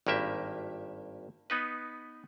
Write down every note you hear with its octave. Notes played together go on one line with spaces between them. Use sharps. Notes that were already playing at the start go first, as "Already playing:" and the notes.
G#1 G2 A#3 G4 E5
B3 D#4 B4